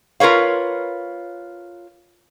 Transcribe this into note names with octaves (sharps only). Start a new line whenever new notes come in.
F4 A#4 B4 C#5 F5